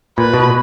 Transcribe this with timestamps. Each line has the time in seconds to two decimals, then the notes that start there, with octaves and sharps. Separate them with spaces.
0.18 A#2 B4
0.34 B2